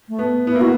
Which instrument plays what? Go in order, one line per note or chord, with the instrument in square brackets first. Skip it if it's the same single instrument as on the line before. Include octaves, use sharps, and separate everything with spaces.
[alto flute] A3
[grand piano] B3
[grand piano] B3 [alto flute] E4
[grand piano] A#3
[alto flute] F#4